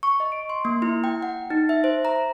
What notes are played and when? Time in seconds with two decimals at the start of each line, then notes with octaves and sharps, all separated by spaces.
0.03 C#6
0.20 D#5
0.32 D7
0.50 C6
0.65 A#3
0.82 E4
1.04 G5
1.22 F#5
1.50 D#4
1.69 E5
1.84 C5
2.05 A#5